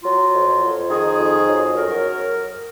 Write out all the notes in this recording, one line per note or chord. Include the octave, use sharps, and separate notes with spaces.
F#3 F4
F2
F2
D#3 G#4
F2
F#3
F#2 A#4